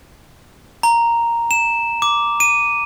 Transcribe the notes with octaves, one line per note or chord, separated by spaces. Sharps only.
A#5
E7
D6
D#7